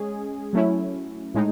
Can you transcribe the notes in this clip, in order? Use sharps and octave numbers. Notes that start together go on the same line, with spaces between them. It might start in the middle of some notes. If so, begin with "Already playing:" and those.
Already playing: G#3 C#4 G#4
F#3 A3 C#4 E4
A2 G#3 D#4